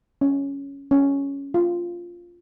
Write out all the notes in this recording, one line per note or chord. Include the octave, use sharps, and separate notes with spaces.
C#4
C#4
F4